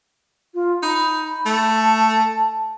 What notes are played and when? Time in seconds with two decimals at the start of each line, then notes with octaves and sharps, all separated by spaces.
0.54 F4
0.83 D#4 B5
1.46 A3
1.78 A5